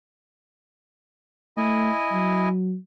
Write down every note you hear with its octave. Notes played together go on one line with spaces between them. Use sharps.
A3 E4 D#5 G#5
F#3